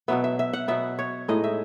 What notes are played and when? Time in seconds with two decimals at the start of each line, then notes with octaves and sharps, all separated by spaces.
0.08 B2 F#3 B3 E5
0.24 E5
0.39 E5
0.53 F#5
0.68 B2 F#3 B3 E5
0.99 C#5
1.28 A2 G#3 D#4 D#5
1.44 E5